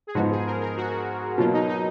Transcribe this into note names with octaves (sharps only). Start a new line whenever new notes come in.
G#4
G#2 F3 B3 D#4 F#4
G#4
A#4
A#4
F#4
B2 F#3 A#3 F4
D#4
D#4